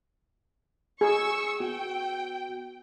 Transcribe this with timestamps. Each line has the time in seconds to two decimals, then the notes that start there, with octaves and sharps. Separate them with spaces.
1.01 G#4 C#6 E6
1.60 B3 F#4 G5